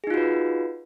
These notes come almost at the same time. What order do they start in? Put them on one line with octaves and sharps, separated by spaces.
G#4 D#4 F4 F#4 B4